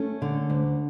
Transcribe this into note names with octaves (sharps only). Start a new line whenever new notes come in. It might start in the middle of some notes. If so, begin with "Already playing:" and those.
Already playing: A3 C#4
D3
D2